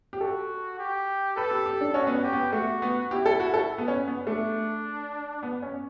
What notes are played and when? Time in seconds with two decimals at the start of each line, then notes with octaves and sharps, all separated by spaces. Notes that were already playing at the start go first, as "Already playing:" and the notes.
0.13 G4
0.20 F#4 A4
0.79 G4
1.36 A4 B4
1.51 G4
1.66 G4
1.81 D4
1.94 C#4 F#4
2.07 B3
2.15 C#4
2.24 G4
2.33 B3
2.53 A3 F#4
2.82 B3
3.11 E4 G4
3.26 A4
3.40 F#4
3.54 A4
3.78 B3
3.88 C#4
4.07 B3
4.27 A3 D4
5.43 B3
5.62 C#4